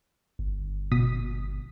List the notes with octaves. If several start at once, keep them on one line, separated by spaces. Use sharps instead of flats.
G1
B2 D#6 B6